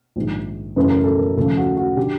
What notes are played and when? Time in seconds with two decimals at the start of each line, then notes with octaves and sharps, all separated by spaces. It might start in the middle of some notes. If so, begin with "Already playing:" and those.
0.16 A#1 G#2 D#3
0.76 F#2 C#3 E3 A3 B4
0.90 A#4
1.04 A4
1.17 A#4
1.37 D#2 C#3 F3 A3 A4
1.57 F#4
1.77 F#4
1.97 D3 G4